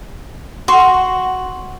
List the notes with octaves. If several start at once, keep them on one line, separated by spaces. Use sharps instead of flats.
F#4 C6